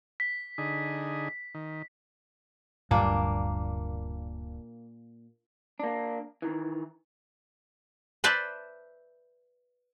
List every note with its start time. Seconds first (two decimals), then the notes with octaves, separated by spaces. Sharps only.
0.20 B6
0.58 D3 D#4 G#4
1.55 D#3
2.91 D1 G2 A#2 A#3 D4
5.80 A#3 D4
6.42 D#3 E3
8.24 B4 C5 D5 E5 A5